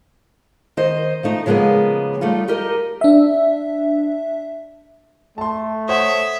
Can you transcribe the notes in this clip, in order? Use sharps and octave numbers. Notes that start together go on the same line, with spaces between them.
D#3 C5 D#5
F3 A3 D#4
C#3 F3 G#3 A#3 B3
G3 A3 D#4 F4
D#4 G4 A#4 D#5
D4 E5
A3 A5 C6
C5 C#5 E5 F#5 D#6